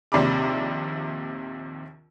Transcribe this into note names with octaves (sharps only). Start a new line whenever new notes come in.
A#1 D#2 C3 D5 B5 D6